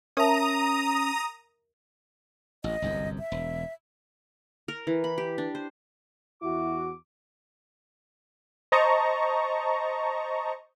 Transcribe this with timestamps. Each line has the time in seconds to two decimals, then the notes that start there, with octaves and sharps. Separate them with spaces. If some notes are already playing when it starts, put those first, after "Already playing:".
0.17 C#4 A#4 E5 A5 A#5 D#6
2.64 A1 D#5
2.82 G1 C2 F#2
3.19 E5
3.32 E1
4.68 A#4
4.87 E3
5.04 B5
5.18 G4
5.38 D4
5.55 C5
6.42 E2 E4 F#4 D6
8.72 C5 D#5 A5 A#5 C#6